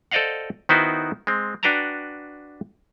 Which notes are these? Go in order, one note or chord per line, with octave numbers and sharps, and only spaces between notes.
A4 C5 D5 D#5 F5 F#5
D#3 B3 D#4 E4 F#4 C5
G#3 C4
D4 F#4 B4 G5 A5 A#5